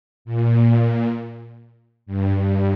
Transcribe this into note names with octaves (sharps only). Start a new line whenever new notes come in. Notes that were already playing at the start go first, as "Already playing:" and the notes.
A#2
G2
G2